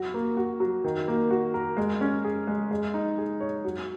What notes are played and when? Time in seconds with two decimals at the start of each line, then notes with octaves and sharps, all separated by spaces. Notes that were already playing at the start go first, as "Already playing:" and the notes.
Already playing: F#3 F#4
0.14 A#3
0.37 F#4
0.60 F#3
0.84 D#3
1.08 A#3
1.31 F#4
1.54 A#4
1.77 G#3
2.01 C#4
2.24 G#4
2.47 G#3
2.71 G#3
2.94 D#4
3.18 G#4
3.40 C#5
3.65 F#3